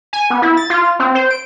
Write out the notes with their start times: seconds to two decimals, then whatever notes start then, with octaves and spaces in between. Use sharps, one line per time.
0.13 G#5
0.30 B3
0.42 E4
0.57 A6
0.70 F4
0.99 C4
1.15 C5
1.31 D7